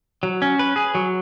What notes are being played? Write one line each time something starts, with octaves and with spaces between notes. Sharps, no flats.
F#3
C#4
B4
G#4
F#3